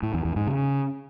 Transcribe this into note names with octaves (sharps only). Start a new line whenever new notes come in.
A2
E2
E2
G#2
C#3